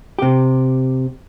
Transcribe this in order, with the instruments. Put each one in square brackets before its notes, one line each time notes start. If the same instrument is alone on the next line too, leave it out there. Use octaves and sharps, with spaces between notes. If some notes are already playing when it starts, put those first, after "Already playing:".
[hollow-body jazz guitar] C3 G4